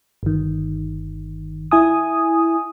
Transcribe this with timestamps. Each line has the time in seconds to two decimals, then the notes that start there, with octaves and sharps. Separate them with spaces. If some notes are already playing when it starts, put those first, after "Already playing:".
0.23 G1 D#3
1.71 E4 G#5 D#6